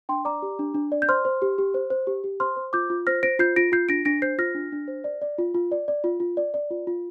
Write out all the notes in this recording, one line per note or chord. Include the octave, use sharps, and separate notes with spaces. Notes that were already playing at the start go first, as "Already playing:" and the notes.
D4 G5 C6
D5 A#5 D6
G4
D4
D4
D5
G6
C5 C6 F6
C5
G4
G4
C5
C5
G4
G4
C5 C6 F6
C5
F4 D6 G6
F4
C5 F6 A#6
C5 A#6 D7
F4 G6 C7
F4 A#6 D7
F4 G6 C7
D4 A#6 D7
D4 A#6 D7
C5 G6 C7
F4 F6 A#6
D4
D4
C5
D5
D5
F4
F4
D5
D5
F4
F4
D5
D5
F4
F4